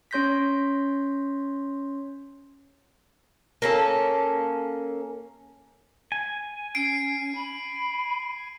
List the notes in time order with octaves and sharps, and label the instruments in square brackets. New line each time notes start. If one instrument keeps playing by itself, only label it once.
[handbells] C#4 C#5 C6 G6 A#6 B6
[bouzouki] A#3 C#4 A4
[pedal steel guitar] G#5
[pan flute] C#4 [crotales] C7 D7
[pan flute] B5